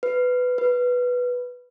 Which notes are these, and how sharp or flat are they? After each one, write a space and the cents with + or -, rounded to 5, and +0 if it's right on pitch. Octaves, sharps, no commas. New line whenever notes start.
B4 +10
B4 -5